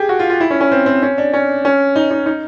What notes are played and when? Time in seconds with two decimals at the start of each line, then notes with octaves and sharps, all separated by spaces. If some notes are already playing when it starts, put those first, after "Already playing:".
Already playing: G4 G#4
0.09 F#4
0.19 F4
0.30 F4
0.40 E4
0.50 C#4
0.61 C#4
0.72 C4
0.86 C4
1.03 C#4
1.18 D4
1.33 C#4
1.65 C#4
1.96 D#4
2.11 D#4
2.26 D#4